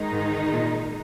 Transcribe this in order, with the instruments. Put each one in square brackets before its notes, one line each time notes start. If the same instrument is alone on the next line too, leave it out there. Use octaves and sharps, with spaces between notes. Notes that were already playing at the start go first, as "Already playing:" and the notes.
Already playing: [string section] D#3 G#3 D#4
[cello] G#2
A#2